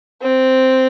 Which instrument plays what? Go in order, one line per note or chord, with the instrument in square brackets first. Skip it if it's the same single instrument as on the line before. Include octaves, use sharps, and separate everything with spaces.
[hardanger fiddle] C4